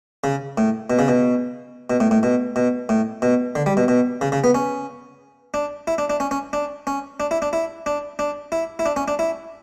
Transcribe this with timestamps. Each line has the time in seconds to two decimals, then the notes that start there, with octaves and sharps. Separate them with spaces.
0.24 C#3
0.58 A2
0.90 B2
0.99 C#3
1.08 B2
1.90 B2
2.00 A2
2.11 A2
2.23 B2
2.56 B2
2.89 A2
3.22 B2
3.55 D3
3.66 G3
3.77 B2
3.88 B2
4.21 C#3
4.32 C#3
4.44 B3
4.55 C#4
5.54 D4
5.87 E4
5.98 D4
6.10 D4
6.20 C#4
6.31 C#4
6.53 D4
6.87 C#4
7.20 D4
7.31 E4
7.42 D4
7.53 E4
7.86 D4
8.19 D4
8.52 E4
8.79 E4
8.86 D4
8.96 C#4
9.08 D4
9.19 E4